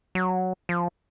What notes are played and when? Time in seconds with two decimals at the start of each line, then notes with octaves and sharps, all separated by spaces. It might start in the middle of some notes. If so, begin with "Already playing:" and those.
0.15 F#3
0.69 F3